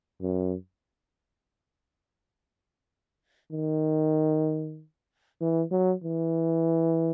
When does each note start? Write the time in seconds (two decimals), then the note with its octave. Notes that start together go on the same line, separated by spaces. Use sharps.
0.21 F#2
3.52 D#3
5.41 E3
5.71 F#3
6.04 E3